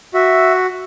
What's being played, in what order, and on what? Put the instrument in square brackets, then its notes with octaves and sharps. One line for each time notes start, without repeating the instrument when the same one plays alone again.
[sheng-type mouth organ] F#4 E5